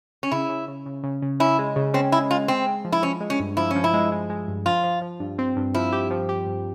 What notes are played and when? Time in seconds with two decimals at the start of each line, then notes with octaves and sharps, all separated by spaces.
0.23 C#4
0.31 C#3 E4
0.49 C#3
0.68 C#3
0.86 C#3
1.03 C#3
1.22 C#3
1.40 C#4 E4
1.59 G#3
1.76 C#3
1.94 C4 C#4
2.12 G#3 E4
2.31 G#3 F4
2.48 G#3 C4
2.66 G#3
2.85 F3
2.92 E4
3.03 F3 C#4
3.21 G#3
3.30 C#4
3.40 G2
3.57 F3 E4
3.71 C#4
3.76 F3
3.84 E4
3.94 G#3
4.12 G#3
4.30 G#3
4.48 G2
4.66 F3 F4
4.84 F3
5.02 F3
5.20 G2
5.39 C4
5.56 G2
5.74 F3 E4
5.93 G4
6.11 F3
6.29 G4
6.47 G2